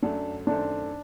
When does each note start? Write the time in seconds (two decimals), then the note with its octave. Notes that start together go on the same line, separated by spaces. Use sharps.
0.02 F#2 F#3 A3 D4
0.47 F#2 D#3 A3 C4 D4